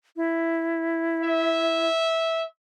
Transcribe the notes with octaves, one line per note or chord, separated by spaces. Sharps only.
E4
E5